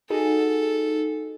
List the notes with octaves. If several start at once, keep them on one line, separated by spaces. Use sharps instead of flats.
D#4 F#4 G#4 A4